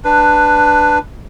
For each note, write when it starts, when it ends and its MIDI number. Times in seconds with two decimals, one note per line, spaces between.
0.04 0.98 62
0.04 0.98 71